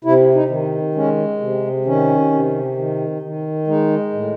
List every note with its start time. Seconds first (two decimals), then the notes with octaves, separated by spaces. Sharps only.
0.04 C3 E4
0.35 D#4
0.50 D#3
0.95 G#3 C#4
1.41 C3
1.86 D#3 C#4
2.32 C3
2.77 D#3
3.22 D#3
3.67 G#3 D#4
4.13 A2